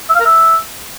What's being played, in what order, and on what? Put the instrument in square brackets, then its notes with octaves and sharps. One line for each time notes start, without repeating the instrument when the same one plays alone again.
[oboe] E5
F5
A#4
E5